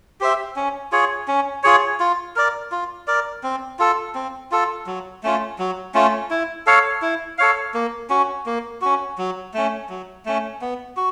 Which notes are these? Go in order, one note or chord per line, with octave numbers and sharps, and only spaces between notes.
G4 C5 E5
C#4
F4 G#4 C#5
C#4
F4 G#4 C#5
F4
A#4 D5
F4
A#4 D5
C4
F4 A4
C4
F4 A4
F#3
A3 C#4 F4
F#3
A3 C#4 F4
E4
A4 C#5 F5
E4
A4 C#5 F5
A#3
C#4 F#4
A#3
C#4 F#4
F#3
A3 C#4
F#3
A3 C#4
B3
F#4